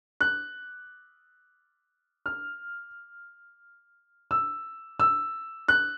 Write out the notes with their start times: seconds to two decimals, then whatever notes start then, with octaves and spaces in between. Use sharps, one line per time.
0.21 F#6
2.26 F6
4.31 E6
5.00 E6
5.68 F#6